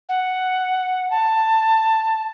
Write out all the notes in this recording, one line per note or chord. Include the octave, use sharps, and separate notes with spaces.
F#5
A5